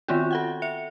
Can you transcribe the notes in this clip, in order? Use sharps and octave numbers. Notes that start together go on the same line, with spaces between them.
D#3 B3 C4 F4 F#4
A4 F#5 G5
E5 C#7